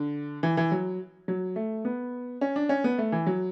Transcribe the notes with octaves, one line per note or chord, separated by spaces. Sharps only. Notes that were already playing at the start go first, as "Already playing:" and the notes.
Already playing: D3
E3
E3
F#3
F#3
A3
B3
C#4
D4
C#4
B3
A3
E3
F#3